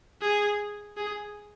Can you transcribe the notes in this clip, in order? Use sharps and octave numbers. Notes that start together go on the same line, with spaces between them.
G#4
G#4